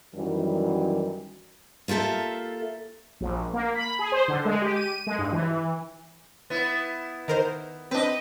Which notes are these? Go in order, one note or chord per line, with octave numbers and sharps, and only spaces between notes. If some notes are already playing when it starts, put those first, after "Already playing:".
F#2 D#3 E3 F#3 G3
A#3 F4 G4 A4 E5
A#1
A#3
B5
G#4
C5
D3
G#3
G4
D#7
G#3
G2
E3
B3 E4
D#3 A#4 C5
C4 D4 B4 D#5